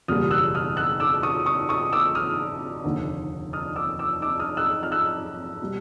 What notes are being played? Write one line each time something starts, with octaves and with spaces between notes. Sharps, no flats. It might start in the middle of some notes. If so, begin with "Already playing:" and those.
F#1 E2 B2 G3 A#3 D#6 F6
E6 F#6
D#6 F6
E6 F#6
D6 E6
C#6 D#6
C#6 D#6
C#6 D#6
D6 E6
D#6 F6
F1 D#2 D3
D#6 F6
D6 E6
D6 E6
D6 E6
D#6 F6
E6 F#6
F6
E6 F#6
B2 G3